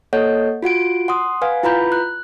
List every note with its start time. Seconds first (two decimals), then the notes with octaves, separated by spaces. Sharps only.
0.13 A#3 A4 C#5 D#5 F#5 G6
0.63 F4 F#4 F#5 D7
1.08 F#5 C6 D#6
1.42 B4 F5 F#5 G#5
1.63 E4 F4 B4 A#5 B5 G6
1.92 F#6